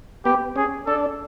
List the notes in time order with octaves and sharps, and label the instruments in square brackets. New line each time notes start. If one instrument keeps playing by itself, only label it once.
[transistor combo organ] B3 [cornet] G4
[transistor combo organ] C#4 [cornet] G#4
[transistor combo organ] D4 [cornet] A4